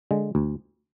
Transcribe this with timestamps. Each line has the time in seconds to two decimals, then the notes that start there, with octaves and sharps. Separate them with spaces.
0.11 D3 G#3
0.35 D2